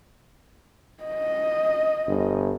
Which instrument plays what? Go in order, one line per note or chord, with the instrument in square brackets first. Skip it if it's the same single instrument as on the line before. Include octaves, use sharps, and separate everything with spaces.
[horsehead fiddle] D#5
[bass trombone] G1